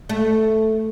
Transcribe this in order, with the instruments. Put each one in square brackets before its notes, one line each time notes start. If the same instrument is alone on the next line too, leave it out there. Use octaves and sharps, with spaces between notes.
[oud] A3